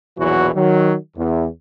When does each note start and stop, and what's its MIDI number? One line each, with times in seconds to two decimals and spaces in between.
0.18 0.50 34
0.18 0.50 40
0.18 0.50 47
0.18 0.50 52
0.18 0.50 54
0.18 0.50 66
0.55 0.95 51
0.55 0.95 54
1.17 1.47 40